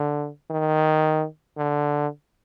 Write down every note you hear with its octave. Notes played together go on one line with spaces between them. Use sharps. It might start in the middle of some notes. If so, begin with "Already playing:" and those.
Already playing: D3
D#3
D3